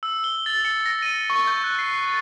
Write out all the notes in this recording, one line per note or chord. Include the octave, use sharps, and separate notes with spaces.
E6
G7
A6
C#7
A#6
D#7
C#6
G6
F#6
C7
A6